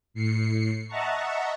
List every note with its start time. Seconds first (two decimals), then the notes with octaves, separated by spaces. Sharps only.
0.14 A2 C7 C#7
0.88 D#5 E5 F#5 A5 A#5 C#6